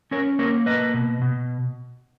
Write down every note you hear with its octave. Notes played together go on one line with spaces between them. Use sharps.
C#4 A#4 C#5
A#3 A#4 C#5
A#3 B4 D#5
B2
B2